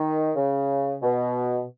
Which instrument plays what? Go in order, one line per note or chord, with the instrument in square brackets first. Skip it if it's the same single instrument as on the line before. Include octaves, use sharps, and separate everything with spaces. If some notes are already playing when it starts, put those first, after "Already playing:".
Already playing: [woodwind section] D#3
C#3
B2